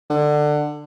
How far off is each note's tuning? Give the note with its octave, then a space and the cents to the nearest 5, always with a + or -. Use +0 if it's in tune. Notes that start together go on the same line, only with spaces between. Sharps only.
D3 +20